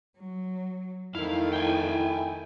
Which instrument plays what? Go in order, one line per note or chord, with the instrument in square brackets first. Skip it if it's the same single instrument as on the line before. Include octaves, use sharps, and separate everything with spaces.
[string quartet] F#3
[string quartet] F2 D#3 A3 [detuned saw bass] E4 [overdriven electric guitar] F5
[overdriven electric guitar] G5 G#5